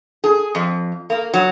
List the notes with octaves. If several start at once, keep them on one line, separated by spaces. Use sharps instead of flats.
G#4
F2
A#3
F#3